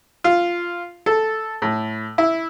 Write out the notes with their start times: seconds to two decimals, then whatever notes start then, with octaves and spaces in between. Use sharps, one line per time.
0.24 F4
1.06 A4
1.62 A2
2.18 E4